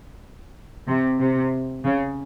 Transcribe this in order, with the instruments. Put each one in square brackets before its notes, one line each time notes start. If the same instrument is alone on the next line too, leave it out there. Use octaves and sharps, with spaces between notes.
[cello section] C3
C3
C#3